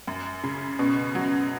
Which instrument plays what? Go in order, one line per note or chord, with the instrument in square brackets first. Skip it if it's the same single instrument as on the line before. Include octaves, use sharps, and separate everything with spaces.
[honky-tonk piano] F#2
C#3
[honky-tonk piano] B2 [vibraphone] C#4
[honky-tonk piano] F#3